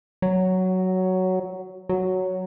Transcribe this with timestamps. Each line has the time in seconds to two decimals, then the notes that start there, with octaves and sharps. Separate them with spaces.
0.22 F#3
1.89 F#3